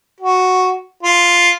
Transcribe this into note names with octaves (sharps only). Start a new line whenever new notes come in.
F#4
F4